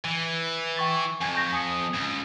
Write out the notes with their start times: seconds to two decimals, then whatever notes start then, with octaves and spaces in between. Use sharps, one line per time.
0.05 E3 D#7
0.77 G5 C#6 A6
1.21 F2 G#5 G#6
1.35 C#6 G6 A#6
1.53 G#5 D#6 C#7
1.95 C#2